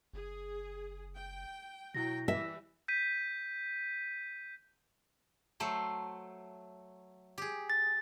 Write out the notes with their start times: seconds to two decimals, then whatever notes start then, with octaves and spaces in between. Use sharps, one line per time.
0.13 F#1 G#4
1.16 G5
1.95 B2 F#3 E4 G5 A#6
2.28 E3 G3 E5
2.88 G6 B6 D#7
5.60 F#3 A3 C5
7.38 G4 G#4
7.70 A6